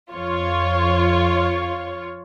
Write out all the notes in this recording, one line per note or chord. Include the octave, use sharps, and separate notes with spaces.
F2 F4 C#5